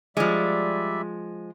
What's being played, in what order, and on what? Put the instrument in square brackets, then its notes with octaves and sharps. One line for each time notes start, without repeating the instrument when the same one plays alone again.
[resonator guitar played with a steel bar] F3 G#3 [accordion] G3 D5 E5